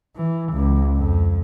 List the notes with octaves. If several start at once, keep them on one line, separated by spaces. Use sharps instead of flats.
E3
C#2
F2